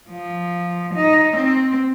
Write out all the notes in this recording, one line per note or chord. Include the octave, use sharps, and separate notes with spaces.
F3
D#4
C4